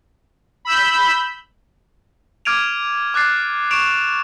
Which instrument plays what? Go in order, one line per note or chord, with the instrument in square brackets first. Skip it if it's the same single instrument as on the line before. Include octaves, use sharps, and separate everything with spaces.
[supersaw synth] B5 E6 G6
[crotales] D6 F6 G#6 D7 D#7 F7
D6 F#6 A6 C7
C#6 D7 E7 F7